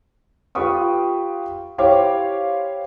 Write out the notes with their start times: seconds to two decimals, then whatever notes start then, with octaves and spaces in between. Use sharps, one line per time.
0.55 F4 G4 B4 G5 C#6 D#6
1.78 E4 G4 C5 C#5 F5 D6